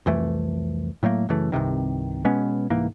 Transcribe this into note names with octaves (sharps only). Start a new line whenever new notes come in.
C2 F2 E3 A3
A2 F#3 A3 A#3
F#2 C#3 E3 A3
C2 G2 C3 D#3
B2 G#3 B3 C#4
C2 G#2 E3 A#3